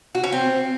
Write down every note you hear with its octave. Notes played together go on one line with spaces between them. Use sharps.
F#4
C#4
C4